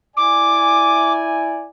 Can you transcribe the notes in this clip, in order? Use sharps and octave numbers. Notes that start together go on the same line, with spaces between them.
E4 D5 G#5 D6